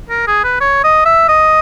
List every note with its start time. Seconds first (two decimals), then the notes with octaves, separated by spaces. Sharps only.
0.10 A#4
0.28 G#4
0.44 B4
0.61 C#5
0.84 D#5
1.06 E5
1.29 D#5